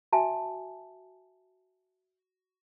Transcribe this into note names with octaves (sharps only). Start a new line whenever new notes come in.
F#4 E5 G#5 A5